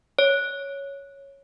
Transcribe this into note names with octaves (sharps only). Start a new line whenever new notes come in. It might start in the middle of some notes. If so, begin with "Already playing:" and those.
C#5